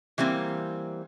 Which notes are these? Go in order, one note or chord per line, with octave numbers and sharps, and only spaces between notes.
E3 G3 A#3 C4